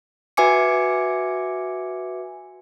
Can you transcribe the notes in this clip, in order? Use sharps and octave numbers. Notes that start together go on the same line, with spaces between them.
F#4 B4 E5 G#5 D6 C#7